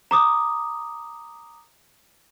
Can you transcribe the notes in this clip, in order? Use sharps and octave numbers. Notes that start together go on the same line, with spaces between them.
A#5 D6 D#6